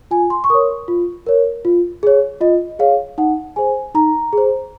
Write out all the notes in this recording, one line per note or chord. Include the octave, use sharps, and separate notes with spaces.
F4 G#5
C6
C#6
A#4 C#5 D#6
F4
A#4 C#5
F4
G#4 C#5
F4 D#5
G#4 C#5 F5
D#4 F#5
G#4 C5 G#5
D#4 A#5
G#4 C5